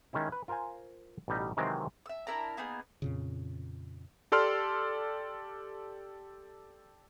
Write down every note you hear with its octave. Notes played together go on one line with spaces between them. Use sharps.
D#3 G#3 C#4 E4
B4
F4 A#4 C5 F5 G#5
A1 B2 G3 D#4
C3 D#3 E3 F#3 G#3 C4
E5 E6
D4 E4 A#4 A#5
A#3 B3 D#4 G#4
F2 A#2 C#3
G4 A4 D5 C6 F6